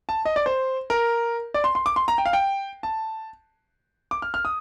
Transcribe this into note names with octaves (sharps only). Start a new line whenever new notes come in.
A5
D#5
D5
C5
A#4
D5
C6
C6
D6
C6
A#5
G5
F5
G5
A5
D6
F6
F6
D#6